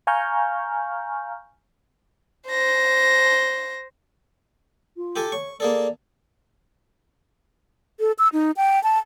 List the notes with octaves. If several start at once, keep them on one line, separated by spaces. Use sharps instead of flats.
F5 G#5 A#5 C#6 F6 G6
C5 A#6
F4
G4 A4 G#5
C#5 C#6
A#3 G#4 A4 D5
A4
E6
D#4
G5
A5